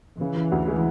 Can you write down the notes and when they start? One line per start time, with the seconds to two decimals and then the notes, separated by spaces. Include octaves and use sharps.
0.20 C#3 E3
0.36 C#3
0.52 D2
0.68 G#3